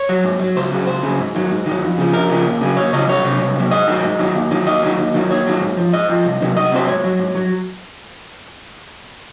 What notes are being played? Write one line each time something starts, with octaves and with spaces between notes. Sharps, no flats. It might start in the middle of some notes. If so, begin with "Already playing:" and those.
Already playing: C#5
F#3
G#2
F#3
C#2 C5
C#3 F#3
C#2 C5
C#3 F#3
G#2
D#3 F#3
G#2
D#3
F#3
F2
C#3 F3
F2 A#4
C#3 F3
D#2
C#3 F#3
D#2 C#5
C#3 F#3 D#5
C2 C#5
C3 F#3
C2
C3 F#3
G#2 D#5
D#3 F#3
G#2
D#3 F#3
D#2
D#3 F#3
D#2 D#5
D#3 F#3
D#2
D#3 F#3
D#2 C#5
D#3 F#3
G#2
F3
G#2 D#5
F3
C2
C3 D#3 F#3
C2 D#5
C3 D#3 F#3 C5
G#2 C#5
F#3
G#2
F#3